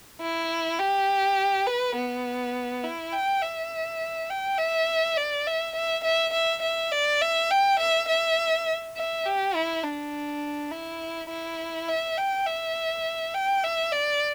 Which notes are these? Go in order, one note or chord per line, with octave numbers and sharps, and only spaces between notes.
E4
G4
B4
B3
E4
G5
E5
G5
E5
D5
E5
E5
E5
E5
E5
D5
E5
G5
E5
E5
E5
G4
E4
D4
E4
E4
E5
G5
E5
G5
E5
D5